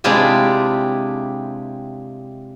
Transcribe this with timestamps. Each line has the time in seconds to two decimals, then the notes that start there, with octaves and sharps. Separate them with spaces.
0.04 C3 G#3 D4 E4 F4 G4